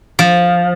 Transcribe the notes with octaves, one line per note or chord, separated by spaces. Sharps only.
F3